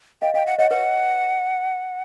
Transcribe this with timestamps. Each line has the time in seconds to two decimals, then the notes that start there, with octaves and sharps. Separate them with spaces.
0.22 D#5 F5 G5
0.34 D#5 F5 G5
0.46 F#5
0.59 C#5 D#5 F#5
0.71 B4 C#5 F#5